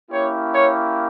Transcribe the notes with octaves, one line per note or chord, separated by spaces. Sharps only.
A#3 C#4 E4 G4 C#5
C#5